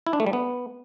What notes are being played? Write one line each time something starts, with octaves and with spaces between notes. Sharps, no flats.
E4
D4
A3
G3
B3